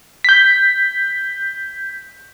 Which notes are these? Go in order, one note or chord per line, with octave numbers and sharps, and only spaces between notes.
G6 B6